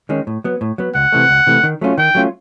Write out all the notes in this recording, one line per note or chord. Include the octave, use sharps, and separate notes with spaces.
D#3 G#3 C#4
A2
F#3 B3
A2
F#3 B3
C#2 F#5
C3 E3 A3
C#2
C3 E3 A3
D#3
F#3 A3 C#4 F4
D#3 G5
F#3 A3 C#4 F4